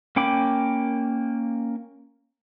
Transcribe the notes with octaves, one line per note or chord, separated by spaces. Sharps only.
A#3 C#4 G5 B5 D6